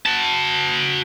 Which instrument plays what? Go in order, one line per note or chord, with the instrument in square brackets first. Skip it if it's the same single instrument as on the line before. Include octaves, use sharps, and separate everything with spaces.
[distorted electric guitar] F#4 A5